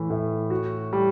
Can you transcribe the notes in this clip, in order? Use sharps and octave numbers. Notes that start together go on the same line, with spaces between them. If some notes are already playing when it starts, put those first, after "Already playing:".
Already playing: A2 E3 A3
A2
F#4
G3